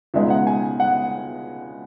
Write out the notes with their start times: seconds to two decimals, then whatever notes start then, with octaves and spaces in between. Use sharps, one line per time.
0.14 C#2 B2 G#3 D#4 E5
0.30 F#5
0.47 G#5
0.80 F#5